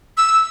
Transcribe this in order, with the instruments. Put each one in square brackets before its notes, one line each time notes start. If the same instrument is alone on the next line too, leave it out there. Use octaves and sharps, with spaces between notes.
[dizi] E6